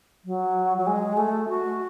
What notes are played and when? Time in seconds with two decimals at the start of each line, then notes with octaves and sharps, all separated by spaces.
0.25 F#3
0.78 F#3
0.87 G#3
1.17 A3
1.49 F#4